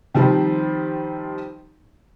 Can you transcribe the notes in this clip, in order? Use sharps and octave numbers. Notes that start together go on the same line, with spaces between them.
D#3 F3 G3 C4 D#4